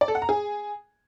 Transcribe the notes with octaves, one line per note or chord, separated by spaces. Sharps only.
D5
A4
F#5
A#5
G#4